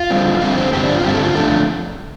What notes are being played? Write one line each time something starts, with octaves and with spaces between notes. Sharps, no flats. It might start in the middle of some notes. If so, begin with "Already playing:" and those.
Already playing: F4
F2 D3 G3 C4
F2 D3 G3 C4 F5
C5
G2 D3 G3 C4 G4
D4
F4
G2 D3 G3 C4 G4
A4
F4
D3 F3 A3 D4 A4